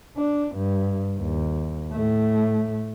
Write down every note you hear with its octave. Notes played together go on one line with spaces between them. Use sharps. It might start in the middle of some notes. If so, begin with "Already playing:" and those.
D4
G2
D#2
A2 A3